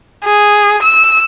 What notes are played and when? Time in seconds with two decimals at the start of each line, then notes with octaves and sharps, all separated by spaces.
0.25 G#4
0.82 E6